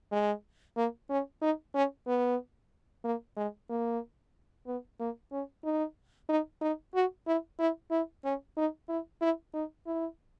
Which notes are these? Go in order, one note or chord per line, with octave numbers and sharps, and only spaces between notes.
G#3
A#3
C#4
D#4
C#4
B3
A#3
G#3
A#3
B3
A#3
C#4
D#4
D#4
D#4
F#4
E4
E4
E4
C#4
D#4
E4
E4
D#4
E4